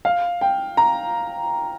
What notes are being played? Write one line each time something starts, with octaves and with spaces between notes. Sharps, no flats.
F5
G5
A#5